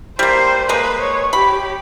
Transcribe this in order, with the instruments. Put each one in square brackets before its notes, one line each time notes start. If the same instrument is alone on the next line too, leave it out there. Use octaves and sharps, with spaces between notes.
[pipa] G3 A#3 [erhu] C5
[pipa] G#3 A#3 [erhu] B4
[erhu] C#5
[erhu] G4 [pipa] B5